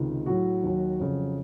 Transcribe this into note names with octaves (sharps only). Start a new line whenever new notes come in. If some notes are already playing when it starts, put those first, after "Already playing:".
Already playing: C#2 C3 D#3
A2 F#3 F#4
D#2 D#3 F#3
F2 C#3 F#3